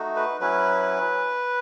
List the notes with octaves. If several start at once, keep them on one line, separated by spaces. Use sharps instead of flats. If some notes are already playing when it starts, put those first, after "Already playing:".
Already playing: A3 D#4 F#4
B4
F#3 C#4 E4 B4